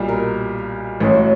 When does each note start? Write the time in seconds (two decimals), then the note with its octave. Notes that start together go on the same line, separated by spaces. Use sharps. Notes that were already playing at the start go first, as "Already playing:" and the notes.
Already playing: B1 A#2 G3
0.08 A#4
1.00 A1 A2 F#3